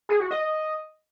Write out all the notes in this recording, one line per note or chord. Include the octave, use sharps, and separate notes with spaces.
G#4
F#4
D#5